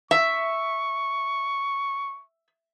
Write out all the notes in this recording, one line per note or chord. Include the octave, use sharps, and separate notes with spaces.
E5 C#6